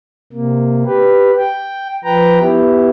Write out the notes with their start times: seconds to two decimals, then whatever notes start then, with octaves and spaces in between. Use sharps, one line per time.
0.32 C3 A#3
0.85 G4 B4
1.38 G5
2.04 F3 B4 G5 A#5
2.40 B3 E4 G4